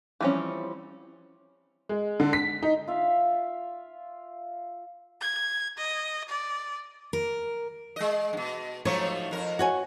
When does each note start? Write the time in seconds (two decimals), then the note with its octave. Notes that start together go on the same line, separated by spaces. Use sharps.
0.20 E3 F3 G3 C4 C#4
1.89 G#3
2.20 D3
2.33 B6
2.62 D#4
2.87 F4 E5 F5
5.21 G#6
5.78 D#5
6.29 D5
7.13 A#4
7.96 G#3 D#5
8.33 G2 B2
8.85 F3 F#3 A3 D#4 C5 C#5
9.31 F2 A#4
9.59 F#4 C#5 G#5